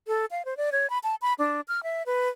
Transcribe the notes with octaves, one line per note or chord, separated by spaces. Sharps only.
A4
F5
C5
D5
C#5
B5
A5
B5
D4
F6
E5
B4